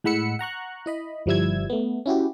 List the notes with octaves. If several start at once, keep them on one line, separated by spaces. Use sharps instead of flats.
A2 G#3 F#5 B5 E6 C#7
F#5 A#5 C#6 F#6
E4 D#5 B5
G1 F3 G3 E4 E6 G#6
A3 B3
C#4 E4 F#4 G4